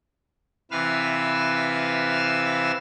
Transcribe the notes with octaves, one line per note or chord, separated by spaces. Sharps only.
C3 E3 B4 F5 E6 F6